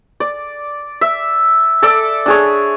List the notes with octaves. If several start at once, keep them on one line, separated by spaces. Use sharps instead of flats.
D5
E5
A4 D5
D4 G#4 C#5